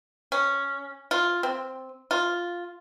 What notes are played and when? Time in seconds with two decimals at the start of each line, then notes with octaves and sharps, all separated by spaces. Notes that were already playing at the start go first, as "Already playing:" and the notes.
0.32 C#4
1.11 F4
1.43 C4
2.11 F4